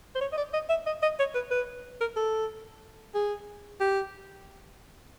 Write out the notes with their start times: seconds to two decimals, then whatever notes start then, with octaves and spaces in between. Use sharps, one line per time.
0.15 C5
0.21 C#5
0.33 D#5
0.38 D5
0.53 D#5
0.69 E5
0.86 D#5
1.03 D#5
1.19 C#5
1.35 B4
1.51 B4
2.01 A#4
2.17 A4
3.15 G#4
3.80 G4